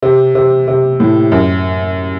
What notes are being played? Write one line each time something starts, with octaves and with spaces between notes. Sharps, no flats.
C3
C3
C3
A2
F#2